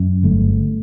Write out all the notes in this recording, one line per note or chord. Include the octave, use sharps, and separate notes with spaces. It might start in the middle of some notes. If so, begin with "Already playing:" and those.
Already playing: F#2
G1 A3